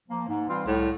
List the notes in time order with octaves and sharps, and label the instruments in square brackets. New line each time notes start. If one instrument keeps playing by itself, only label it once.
[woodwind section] F3 A#3
G#2
E3 G3 C4 F4
[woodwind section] C2 [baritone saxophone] A2